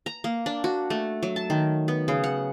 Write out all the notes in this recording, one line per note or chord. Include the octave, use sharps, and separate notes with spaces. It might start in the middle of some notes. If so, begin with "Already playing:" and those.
A#5
A#3
D4
F#4
A3
F#3
A5
D#3
B3
C#3
F#5